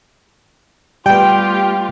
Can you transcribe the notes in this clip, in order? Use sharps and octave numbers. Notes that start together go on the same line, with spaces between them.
G3 A3 B3 F4 G4 G5